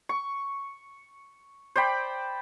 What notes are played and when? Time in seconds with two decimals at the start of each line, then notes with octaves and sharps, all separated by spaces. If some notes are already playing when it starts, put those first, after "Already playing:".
0.09 C#6
1.76 C5 D5 G5 B5